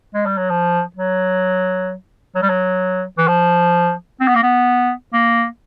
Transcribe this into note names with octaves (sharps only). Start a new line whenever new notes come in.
G#3
G3
F#3
F3
F#3
F#3
G3
F#3
E3
F3
C4
B3
A#3
B3
A#3